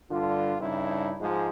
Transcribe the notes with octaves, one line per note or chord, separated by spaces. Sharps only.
G2 D3 F4
G2 C#3 D#4 E4
G#2 F3 G#3